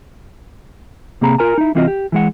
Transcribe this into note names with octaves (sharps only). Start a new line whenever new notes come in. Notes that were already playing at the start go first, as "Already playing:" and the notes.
C3 A#3 C4 G#4 A#5 B5
F4 A#4 G#5 A#5
D#4 E4
C2 E3 C4 F4 F#4 D#5
G4
E3 G#3 F#5